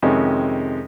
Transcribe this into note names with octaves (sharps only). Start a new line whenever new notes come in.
F2 C3 D#3 G#3 C#4